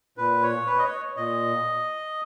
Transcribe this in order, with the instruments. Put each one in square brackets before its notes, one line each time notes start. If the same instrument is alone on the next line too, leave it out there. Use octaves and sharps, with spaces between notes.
[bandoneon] A#2 B4
C#5
B4
D#5
C#5
A#2 D#5